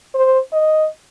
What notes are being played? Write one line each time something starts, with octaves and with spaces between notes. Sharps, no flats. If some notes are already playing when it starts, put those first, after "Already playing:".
C5
D#5